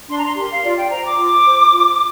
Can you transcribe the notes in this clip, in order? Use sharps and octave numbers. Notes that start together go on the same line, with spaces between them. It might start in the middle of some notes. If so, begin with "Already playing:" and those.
D4 C6
A#5
C6
G4 A#4 C6
F5
F4 D5
G5
C5 A#5
D6
F4
C5
F4